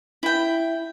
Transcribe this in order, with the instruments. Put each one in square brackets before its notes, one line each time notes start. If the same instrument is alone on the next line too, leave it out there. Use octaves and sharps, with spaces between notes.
[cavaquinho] E4 G5